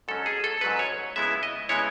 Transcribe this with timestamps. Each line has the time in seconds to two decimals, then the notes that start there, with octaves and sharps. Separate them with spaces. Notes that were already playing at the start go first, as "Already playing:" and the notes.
0.08 G#2 F#3 C#4 A4
0.26 G#4
0.44 A4
0.61 G#2 F#3 C#4 B4
0.79 C#5
1.16 C#3 G#3 B3 E4 E5
1.43 D#5
1.69 C#3 G#3 B3 E4 C#5